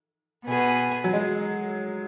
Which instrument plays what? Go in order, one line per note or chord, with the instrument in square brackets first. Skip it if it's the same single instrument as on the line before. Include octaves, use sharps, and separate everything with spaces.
[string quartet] B2 B3 G#4
[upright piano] F#3
G#3